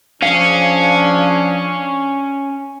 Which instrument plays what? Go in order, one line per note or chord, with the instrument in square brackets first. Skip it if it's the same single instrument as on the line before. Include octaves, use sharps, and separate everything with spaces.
[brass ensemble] F3 D4 G#4 [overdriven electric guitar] C#4 [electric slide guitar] F5